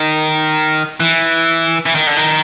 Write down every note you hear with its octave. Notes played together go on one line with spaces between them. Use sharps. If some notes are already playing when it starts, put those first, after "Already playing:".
Already playing: D#3
E3
E3
D#3
D3
D#3